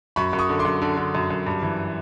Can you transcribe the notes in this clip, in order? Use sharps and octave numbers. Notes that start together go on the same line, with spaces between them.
F#2 B5 C#6
F#2
C#6 D#6
D3
C6 D6
F#2
D3
D3
F#2
F#2
G2
E3